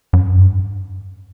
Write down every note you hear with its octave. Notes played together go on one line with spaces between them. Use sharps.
F#2
G2